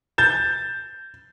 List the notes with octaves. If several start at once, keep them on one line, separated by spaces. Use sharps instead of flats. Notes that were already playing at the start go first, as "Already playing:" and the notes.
G6 A6 E7